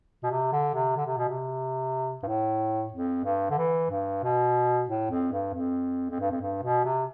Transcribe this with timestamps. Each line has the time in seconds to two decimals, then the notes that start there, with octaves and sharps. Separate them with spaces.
0.23 B2
0.31 C3
0.52 D3
0.74 C3
0.96 D3
1.06 C3
1.18 B2
1.29 C3
2.23 G2
2.27 A2
2.93 F2
3.25 G2
3.51 D3
3.58 E3
3.90 G2
4.24 B2
4.89 A2
5.11 F2
5.32 G2
5.54 F2
6.11 F2
6.20 G2
6.31 F2
6.41 G2
6.63 B2
6.85 C3